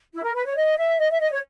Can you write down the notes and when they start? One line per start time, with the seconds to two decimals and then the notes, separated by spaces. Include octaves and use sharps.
0.14 E4
0.24 A#4
0.35 B4
0.46 C#5
0.57 D#5
0.78 E5
1.00 D#5
1.11 E5
1.20 D#5
1.32 C#5